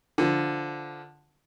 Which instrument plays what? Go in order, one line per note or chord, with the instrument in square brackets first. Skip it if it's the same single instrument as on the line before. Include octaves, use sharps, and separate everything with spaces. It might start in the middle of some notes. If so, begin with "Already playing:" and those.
[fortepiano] D3 F3